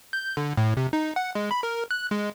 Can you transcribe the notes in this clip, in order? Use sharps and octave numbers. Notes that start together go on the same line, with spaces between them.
G6
D3
A2
C3
D#4
F#5
G#3
B5
A#4
F#6
G#3